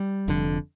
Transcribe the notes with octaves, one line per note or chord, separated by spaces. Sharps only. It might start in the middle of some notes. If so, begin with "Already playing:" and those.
Already playing: G3
F1 F2 D3